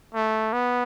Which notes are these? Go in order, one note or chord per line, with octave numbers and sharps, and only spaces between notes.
A3
B3